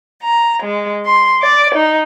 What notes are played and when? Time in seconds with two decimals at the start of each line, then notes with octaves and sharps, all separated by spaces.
0.22 A#5
0.62 G#3
1.06 C6
1.41 D5
1.74 D#4